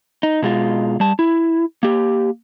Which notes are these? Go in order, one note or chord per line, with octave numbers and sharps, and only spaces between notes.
D#4
B2 G#3 F4
G3 A5
E4
A#3 G4